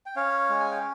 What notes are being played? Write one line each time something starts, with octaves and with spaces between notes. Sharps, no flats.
G5
C#4 C#5 F5
G#3
G#5
G5